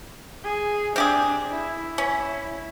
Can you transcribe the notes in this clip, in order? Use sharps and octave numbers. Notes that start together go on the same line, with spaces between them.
G#4
C4 D4 G4 G#4
E4
C#4